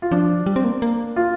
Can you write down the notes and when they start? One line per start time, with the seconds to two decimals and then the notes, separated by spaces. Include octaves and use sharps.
0.02 F4
0.11 F3 D4
0.46 G3
0.56 C4
0.64 A#3
0.82 A#3
1.16 F4